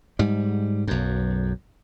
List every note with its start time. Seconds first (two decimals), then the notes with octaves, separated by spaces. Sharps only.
0.19 G#2 G3
0.87 B1 F#2